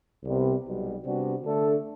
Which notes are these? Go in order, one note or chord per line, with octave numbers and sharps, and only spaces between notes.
C2 C3 G3 B3
B1 B2 G3
C3 G3 B3 D4 F#4
D3 A3 D4 A4